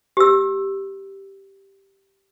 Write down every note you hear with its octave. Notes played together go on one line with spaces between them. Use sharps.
G4 E6